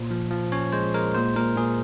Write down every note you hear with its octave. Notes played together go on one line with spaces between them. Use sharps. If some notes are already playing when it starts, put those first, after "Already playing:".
Already playing: A#2 C5
F3
F3
C#4 C#5
G#3 C5
G#3 A#4
A#2 C5
A#2 A#4
A#2 G#4